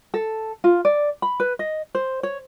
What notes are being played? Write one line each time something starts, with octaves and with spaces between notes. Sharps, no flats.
A4
F4
D5
B5
B4
D#5
C5
C#5